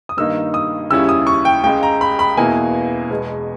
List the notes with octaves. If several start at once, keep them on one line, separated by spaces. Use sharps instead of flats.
D#6
G2 D#3 A#3 D#4 E6
D#6
D#2 C#3 G3 C#4 E4 E6
D#6
C#6
G5
C#2 C#3 G#3 G5
A#5
B5
B5
E2 B2 A#3 E4 G#5
E2 B2 G#3